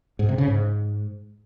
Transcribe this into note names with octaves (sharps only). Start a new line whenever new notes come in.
G#2
C3
C#3
G#2